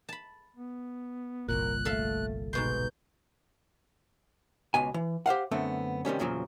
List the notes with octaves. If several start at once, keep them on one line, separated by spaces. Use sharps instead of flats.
A5 B5
B3
G1 C2 A#2 A#4 F#6
A3 A4 E5 F5
G#2 B2 D#4 C6 G6
C#2 B2 G#5
E3
G4 C5 F5 F#5
F#2 D3 A3 B3 C4
C3 D#3 G3 C#4
E2 A#2 C#3 F3 F#3